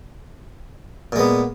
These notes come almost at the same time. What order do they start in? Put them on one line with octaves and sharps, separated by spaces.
A#2 G#3 B3